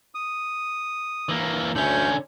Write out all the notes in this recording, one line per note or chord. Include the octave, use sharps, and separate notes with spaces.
D#6
E3 A#3
D2 D3 C#4 G6